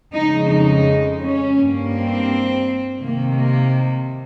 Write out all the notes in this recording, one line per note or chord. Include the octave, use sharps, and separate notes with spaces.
F2 C#3 G#3 D#4
D#4
C#4
G2 G3 A#3
C4
C3 D#3 A#3
A#3